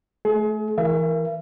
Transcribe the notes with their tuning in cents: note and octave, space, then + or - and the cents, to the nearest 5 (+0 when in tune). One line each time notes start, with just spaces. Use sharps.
A3 -25 G#4 +35
E3 +0 A#4 +0 E5 +40